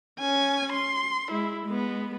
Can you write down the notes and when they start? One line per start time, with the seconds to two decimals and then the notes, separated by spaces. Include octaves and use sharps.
0.20 C#4 G#5
0.73 C6
1.31 G#3 E4
1.66 G#3 B3